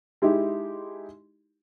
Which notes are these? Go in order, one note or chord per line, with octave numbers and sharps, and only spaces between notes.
G#3 D#4 E4 G4